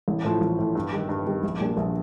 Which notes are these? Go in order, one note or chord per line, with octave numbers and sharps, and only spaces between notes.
A1
A2 F3
A1
A2 F3
G2
D#3 G3
G2
D#3 G3
A#1
A#2 G3 D4
A#1